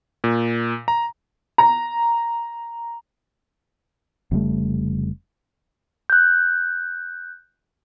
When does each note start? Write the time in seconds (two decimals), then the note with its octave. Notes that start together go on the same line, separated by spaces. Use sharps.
0.24 A#2
0.88 A#5
1.58 A#5
4.31 F1 C#3 G3 A3
6.10 F#6 G6